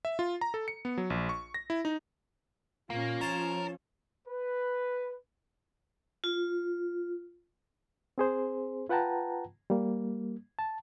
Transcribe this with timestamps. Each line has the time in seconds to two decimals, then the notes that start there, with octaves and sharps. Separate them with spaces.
0.05 E5
0.19 F4
0.41 A#5
0.54 A4
0.68 C#7
0.85 B3
0.98 F#3
1.10 A#1
1.29 C#6
1.54 A#6
1.70 E4
1.85 D#4
2.90 A#2 A#3 C#4 F4
3.21 F3 A#4 C5 C#5 A5
4.27 B4
6.24 F4
8.18 C4 G#4 C5
8.89 F4 B4 F#5 G5 A5 A#5
9.70 G3 A#3
10.59 A5